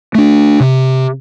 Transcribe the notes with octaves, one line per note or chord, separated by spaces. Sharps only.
A3 D4
C3